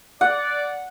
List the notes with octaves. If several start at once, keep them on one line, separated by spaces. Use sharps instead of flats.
D5 F#5